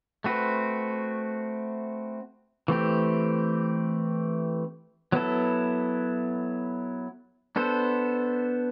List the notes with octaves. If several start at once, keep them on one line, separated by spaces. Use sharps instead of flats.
A3 C4 F#4 B4
E3 A3 C4 G4
F#3 B3 E4 A4
B3 D4 A4 C5